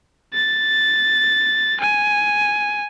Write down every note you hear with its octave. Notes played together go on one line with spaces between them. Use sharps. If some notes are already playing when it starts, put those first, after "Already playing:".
A6
G#5